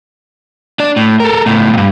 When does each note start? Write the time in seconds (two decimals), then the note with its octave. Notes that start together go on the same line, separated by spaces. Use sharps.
0.80 D4 D5
0.96 A2
1.20 A4 A#4
1.46 C#2 A2
1.73 G2 A#2